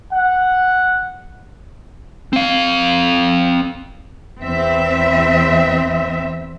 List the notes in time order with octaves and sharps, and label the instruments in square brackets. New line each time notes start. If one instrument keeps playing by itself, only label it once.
[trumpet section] F#5
[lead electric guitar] C4 F5
[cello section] E2 C4 E5